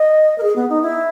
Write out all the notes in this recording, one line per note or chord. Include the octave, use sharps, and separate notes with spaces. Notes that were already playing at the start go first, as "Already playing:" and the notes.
Already playing: D#5
A#4
G#4
B3
D#4
E4